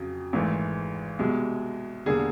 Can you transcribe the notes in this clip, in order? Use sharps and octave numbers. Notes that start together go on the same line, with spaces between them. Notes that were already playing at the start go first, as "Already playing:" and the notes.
Already playing: F2 C#3 F#3
G#1 G#2 E3 A3
C2 B2 G#3
E1 D3 G3 A#3 G#4